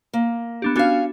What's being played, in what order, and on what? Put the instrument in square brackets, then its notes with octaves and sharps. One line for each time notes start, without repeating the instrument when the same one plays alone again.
[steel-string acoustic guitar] A#3
[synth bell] B3 D4 G4
[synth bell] B3 D4 F#4 [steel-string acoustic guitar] C#4 F5